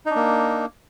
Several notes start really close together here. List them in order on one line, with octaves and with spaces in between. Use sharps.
D#4 D4 A#3